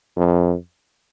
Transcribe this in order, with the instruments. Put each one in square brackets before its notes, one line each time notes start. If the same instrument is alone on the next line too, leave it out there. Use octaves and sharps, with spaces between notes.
[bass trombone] F2